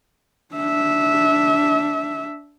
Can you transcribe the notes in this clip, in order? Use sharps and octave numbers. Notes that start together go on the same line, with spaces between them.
D4 E5